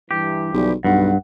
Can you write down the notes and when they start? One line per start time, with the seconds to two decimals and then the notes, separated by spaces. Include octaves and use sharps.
0.11 G2 E3 G4
0.54 B1 E3 F3 G3
0.85 B1 G2 F#5